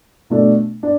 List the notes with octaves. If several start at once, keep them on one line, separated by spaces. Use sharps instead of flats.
B2 A3 D4
D4